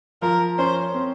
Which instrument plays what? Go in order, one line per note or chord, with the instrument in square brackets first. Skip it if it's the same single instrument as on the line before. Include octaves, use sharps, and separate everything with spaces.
[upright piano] F3 [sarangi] A#4
[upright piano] C#4 [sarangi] C5
[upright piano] C4